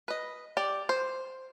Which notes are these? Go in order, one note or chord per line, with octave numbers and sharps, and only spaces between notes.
B4 D#5
G4 D5
C5